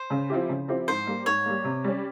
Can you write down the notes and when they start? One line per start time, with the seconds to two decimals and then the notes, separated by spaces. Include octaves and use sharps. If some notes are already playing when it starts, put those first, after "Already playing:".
Already playing: C5
0.10 C#3
0.30 F3 C4 E4 G4
0.49 C#3
0.68 F3 C4 E4 G4
0.88 G#2 C5
1.07 G3 A#3
1.26 G#2 C#5
1.46 G3 A#3
1.64 C3
1.84 G3 C#4